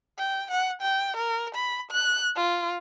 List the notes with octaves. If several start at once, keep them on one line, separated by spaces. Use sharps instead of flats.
G5
F#5
G5
A#4
B5
F#6
F4